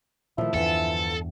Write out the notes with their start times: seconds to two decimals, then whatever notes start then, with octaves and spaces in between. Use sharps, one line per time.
0.38 A#2 D#3 F3 A3 E4
0.54 E2 G2 D3 E3 F3 A4